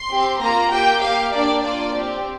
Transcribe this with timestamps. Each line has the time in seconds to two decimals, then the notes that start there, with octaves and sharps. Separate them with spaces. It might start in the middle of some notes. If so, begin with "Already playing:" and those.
Already playing: C6
0.09 C4 G4
0.41 A#3 F4 A#5
0.71 A#3 G4 G5
1.01 A#3 G4 F5
1.32 A#3 D4 G4 D5
1.63 A#3 F4 D5
1.94 C4 G4